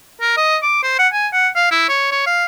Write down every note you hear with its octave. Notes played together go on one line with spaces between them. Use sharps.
A#4
D#5
D6
C5
F#5
G#5
F#5
F5
E4
C#5
C#5
F5